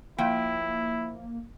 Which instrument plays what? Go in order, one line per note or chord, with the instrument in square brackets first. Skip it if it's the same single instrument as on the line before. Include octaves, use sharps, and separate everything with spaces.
[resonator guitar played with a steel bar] F3 G5 [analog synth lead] A#3 [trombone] E4